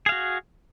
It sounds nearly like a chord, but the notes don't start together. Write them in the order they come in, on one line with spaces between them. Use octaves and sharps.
G#4 F5 F#4